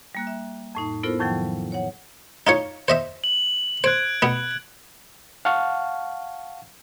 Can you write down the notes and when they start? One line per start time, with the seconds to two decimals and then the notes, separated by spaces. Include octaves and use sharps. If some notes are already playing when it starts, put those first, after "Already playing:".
0.15 G3 A#3 F#6
0.27 E5
0.75 F2 A2 D#4
1.03 B3 E4 F4 A4 A#4 C5
1.19 F2 A2 D#3 F3 F#3 G5
1.72 C#5 F#5
2.47 D#4 F4 C#5
2.88 C5 D#5 E5
3.24 F#7
3.84 C5 F#6 G#6 D7
4.22 B2 B3
5.45 F5 F#5 A5 C#6 F6